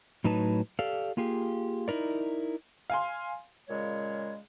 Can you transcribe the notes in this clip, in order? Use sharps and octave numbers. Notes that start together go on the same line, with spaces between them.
A2 F#3 D#4 B4 A5
G4 A4 D5 F5
A#3 F4 G4 G#4
D#4 E4 A#4 D5
F5 G#5 C6
A#2 C#3 G#3 C#5